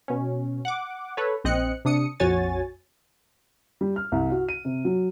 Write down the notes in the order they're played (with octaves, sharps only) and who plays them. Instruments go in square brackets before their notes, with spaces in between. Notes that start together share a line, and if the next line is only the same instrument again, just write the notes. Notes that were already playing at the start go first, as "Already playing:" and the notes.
[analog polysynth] B2 C#4
F#5 D6
A4 B4 C#5
A#1 C4 D#5 F#6 C#7
C3 D4 D#6 C#7
A#1 F2 F#4 C#5 G#5 A6
[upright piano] G3
F6
C2
F#4
D#7
C3
F#3